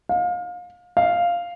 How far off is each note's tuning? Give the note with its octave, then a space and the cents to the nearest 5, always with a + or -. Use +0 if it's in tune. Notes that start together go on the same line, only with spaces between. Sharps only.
F5 +30
F5 -5